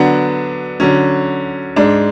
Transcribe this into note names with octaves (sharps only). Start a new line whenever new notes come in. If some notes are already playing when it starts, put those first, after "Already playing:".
Already playing: D3 F#3 B3 D4
D3 F#3 C#4
G#2 G#3 D4